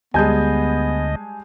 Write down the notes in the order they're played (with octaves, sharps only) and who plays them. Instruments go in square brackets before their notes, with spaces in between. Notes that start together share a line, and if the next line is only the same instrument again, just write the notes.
[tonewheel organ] D2 D#5 [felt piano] G3 G#3 [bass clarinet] B3 [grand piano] G#5 A5 G6